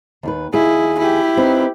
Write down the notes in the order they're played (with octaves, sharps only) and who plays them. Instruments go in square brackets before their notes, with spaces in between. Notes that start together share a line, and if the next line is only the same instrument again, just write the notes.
[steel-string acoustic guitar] D#2 D#3 B4
[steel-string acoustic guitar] D#2 G#4 [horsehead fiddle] E4
[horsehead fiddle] E4 G4
[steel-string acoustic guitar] C4 D#4 B4